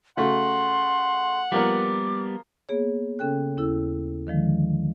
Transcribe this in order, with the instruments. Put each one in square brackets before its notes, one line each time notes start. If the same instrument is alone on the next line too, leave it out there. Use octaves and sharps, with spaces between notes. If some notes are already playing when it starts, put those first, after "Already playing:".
[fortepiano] C#3 A3 F#4 [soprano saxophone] F#5 [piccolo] C6
[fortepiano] F3 A#3 A#4 [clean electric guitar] G3 B3 [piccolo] D6
[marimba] A#3 B3 G#4 C#5
C#3 C#4 A4 G5 F#6
D#2 C#4 E4 A4 E6
D3 D#3 F3 G#3